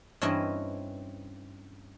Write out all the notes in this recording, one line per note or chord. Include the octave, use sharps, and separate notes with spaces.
G2 E3 C4 C#4 E4 D#5